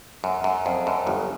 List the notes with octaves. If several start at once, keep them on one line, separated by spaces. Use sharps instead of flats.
F#2
F#2
F2
F#2
G1 G2